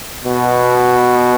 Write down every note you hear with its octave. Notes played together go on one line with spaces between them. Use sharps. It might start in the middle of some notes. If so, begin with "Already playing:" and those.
B2